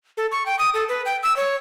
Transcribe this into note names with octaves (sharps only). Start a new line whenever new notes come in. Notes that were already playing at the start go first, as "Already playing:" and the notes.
A4
C#6
G5
D#6
A4
B4
G5
E6
C#5